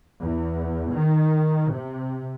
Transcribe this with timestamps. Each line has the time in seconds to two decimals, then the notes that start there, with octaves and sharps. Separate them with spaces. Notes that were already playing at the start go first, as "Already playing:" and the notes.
0.21 E2
0.92 D#3
1.73 C3